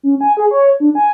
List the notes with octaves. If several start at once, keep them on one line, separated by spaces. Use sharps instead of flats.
C#4
G#5
G#4
C#5
D4
G#5